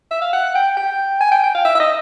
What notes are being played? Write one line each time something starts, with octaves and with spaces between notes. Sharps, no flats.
E5
F5
F#5
G5
G5
G#5
G5
G5
F5
E5
E5
D#5